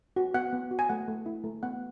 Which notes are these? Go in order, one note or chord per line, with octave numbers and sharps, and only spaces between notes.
F#4
B3 F#5
B3
F#4
G#5
A3 F#5
A3
E4
A3
B3 F#5